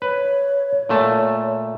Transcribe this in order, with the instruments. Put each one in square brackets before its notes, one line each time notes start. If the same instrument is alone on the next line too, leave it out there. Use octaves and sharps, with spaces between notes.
[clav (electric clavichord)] B4 [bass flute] C#5
[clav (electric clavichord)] A#2 A3 A5